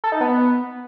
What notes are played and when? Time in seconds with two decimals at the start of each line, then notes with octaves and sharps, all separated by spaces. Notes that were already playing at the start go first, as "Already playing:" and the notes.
0.04 A4
0.12 D#4
0.21 B3